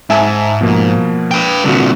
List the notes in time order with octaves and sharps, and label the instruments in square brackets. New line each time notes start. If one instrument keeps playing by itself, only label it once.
[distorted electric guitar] G#2 [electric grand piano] E5 G#5 A5
[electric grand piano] B2 F3 A#3
[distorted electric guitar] B4 G5
[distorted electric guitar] C2 A#2 [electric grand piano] D3 F#4